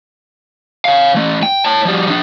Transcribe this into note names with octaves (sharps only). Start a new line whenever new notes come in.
C#5 F5
E3 A3
G5
C#5 A5
F3 G3
F3 D4